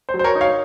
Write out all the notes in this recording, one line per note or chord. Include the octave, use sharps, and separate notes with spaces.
C5
F#3
C5
A#4 C#5
D#4
C#5 F5